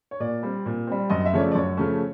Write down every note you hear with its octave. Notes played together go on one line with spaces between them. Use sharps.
C#5
A#2 D5
G3 C4
A#2
G3 C4
F#2 D#5
E5
C#3 F3 A3 C#4 C#5
D5
D5
F#2 C#5
C#3 F3 A3 C#4